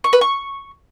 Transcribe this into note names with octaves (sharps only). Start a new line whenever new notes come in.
C#6
B4
C#6